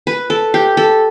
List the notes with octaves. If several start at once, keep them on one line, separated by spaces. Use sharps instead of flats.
B4
A4
G4
A4